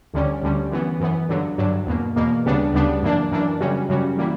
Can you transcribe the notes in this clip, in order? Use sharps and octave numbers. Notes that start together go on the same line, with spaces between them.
D2 D3 G3 C#4
D2 D3 G3 C#4
F#2 E3 B3
F#2 E3 B3
G2 D3 F#3
G2 D3 F#3
E2 B2 A#3
E2 B2 A#3
D2 C#3 G3 B3 D4
D2 C#3 G3 B3 D4
F#2 E3 A#3 D4
F#2 E3 A#3 D4
F#2 C#3 G3 C#4 F#4
F#2 C#3 G3 C#4 F#4
E3 G3 A#3 E4